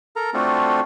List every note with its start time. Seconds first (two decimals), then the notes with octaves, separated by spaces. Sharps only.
0.16 A4 A#4 A#5
0.34 A3 C4 D4 F4 F#4 A4